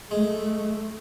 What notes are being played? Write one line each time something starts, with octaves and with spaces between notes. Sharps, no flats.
G#3 A3